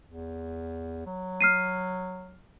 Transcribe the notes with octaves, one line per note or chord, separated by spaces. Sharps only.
E2
F#3
F6 C7 D#7